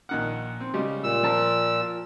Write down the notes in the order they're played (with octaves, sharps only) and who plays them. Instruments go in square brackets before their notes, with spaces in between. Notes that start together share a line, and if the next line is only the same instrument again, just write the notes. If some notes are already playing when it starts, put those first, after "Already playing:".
[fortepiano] A#1 D#3 F#5
C4
C#3 G3 G#3
[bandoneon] A#2 E6
[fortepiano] F3 A#4 A5